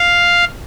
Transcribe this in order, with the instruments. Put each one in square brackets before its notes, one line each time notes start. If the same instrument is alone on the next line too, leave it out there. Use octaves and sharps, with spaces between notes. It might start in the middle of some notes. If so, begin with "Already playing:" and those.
Already playing: [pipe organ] F5